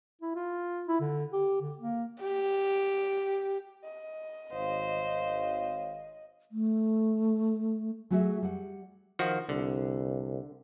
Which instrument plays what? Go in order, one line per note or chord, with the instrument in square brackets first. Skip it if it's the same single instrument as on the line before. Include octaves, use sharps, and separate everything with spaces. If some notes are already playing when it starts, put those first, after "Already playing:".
[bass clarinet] E4
F4
E4
D3
G4
D3
A#3
[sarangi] G4
D#5
[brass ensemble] G#1 C#5 F5 [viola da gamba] C5
[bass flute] A3
[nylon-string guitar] F#3 A3 F#4 G#4 E5
G3 F#5
[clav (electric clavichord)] D#3 F3 F#4
[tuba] C2 [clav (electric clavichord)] D3